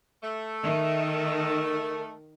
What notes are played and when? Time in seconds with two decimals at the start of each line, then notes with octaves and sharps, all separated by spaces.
0.23 A3
0.64 D#3 E5
1.13 A#4